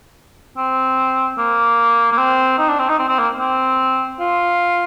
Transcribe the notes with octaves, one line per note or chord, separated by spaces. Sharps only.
C4
A#3
A#3
C4
D#4
D4
C4
D#4
C4
C4
A#3
C4
F4